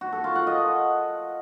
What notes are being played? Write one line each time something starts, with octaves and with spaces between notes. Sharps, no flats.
F#4
A4
F4
F#5
D#5